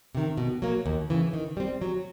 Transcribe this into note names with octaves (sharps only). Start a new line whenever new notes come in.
C3 D#3
B2
F#3 A#3
D#2
C#3 E3
D#3
G3 C4
F#3